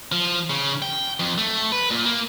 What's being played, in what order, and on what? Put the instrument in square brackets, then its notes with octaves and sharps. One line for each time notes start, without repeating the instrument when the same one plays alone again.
[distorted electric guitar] F3
C#3
G5
F2
A3
B4
A#2
A#3